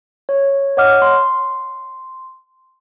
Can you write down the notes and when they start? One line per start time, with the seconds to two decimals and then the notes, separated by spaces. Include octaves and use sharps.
0.29 C#5
0.77 C#5 D#5 F#5 D6 F6
1.02 C6